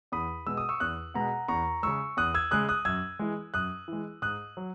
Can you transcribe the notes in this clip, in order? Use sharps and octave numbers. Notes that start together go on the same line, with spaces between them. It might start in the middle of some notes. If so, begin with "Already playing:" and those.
E2 B5 D#6
B2 G#3 E6
D#6
C#6 E6
E2 D#6 F#6
B2 G#3 F#5 A#5
E2 A#5 C#6
C#3 G#3 C#6 E6
E2 D#6 F#6
E6 G#6
C#3 G#3 D#6 F#6
D#6 F#6
F#2 E6 G#6
E3 G#3
F#2 D#6 F#6
E3 G#3
G#2 D#6 F#6
F#3